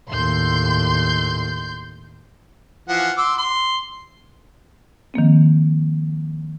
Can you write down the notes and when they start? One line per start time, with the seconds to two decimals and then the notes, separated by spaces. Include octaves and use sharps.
0.10 D#2 A2 C6 G6
2.89 E3 F3 F#5
3.17 C6 D6 E6
3.38 C6
5.14 D#3 F3 A#3 C4